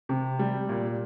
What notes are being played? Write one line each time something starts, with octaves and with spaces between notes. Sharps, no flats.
C3
G3
A#2